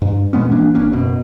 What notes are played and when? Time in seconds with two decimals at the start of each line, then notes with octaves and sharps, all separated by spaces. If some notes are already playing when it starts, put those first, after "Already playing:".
0.02 G2
0.33 A#2 G#3 B3 C#4
0.50 E3 A#3 D4
0.75 G#1 A#3 C#4 D4
0.92 F#1 B2